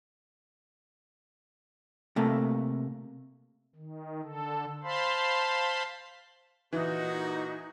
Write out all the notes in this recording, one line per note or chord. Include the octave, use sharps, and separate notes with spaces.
C3 A3 A#3
D#3
D3 A4
C5 F5 A5 B5 C6
A#2 E3 D#4 F#4